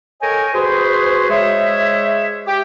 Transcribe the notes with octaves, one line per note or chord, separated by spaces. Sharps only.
A4 A#4 C#5 D#5 G5 G#5
F#4 G#4 B4 C5
G#3 G#4 C5 C#5 E5
G4